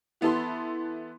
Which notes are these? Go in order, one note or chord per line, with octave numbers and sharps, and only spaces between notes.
E3 B3 E4 A4 C6